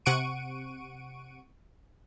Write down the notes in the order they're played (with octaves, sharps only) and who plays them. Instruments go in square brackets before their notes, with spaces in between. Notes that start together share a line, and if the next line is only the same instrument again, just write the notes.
[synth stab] C3 F#5 C#6 D7 D#7